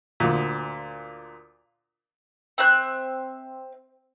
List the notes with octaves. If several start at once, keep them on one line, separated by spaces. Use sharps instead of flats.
D2 A#2
C4 E5 F#6